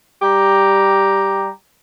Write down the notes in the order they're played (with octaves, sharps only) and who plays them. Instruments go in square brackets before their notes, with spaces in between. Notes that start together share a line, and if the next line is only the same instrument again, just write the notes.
[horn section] G3 G4 A#5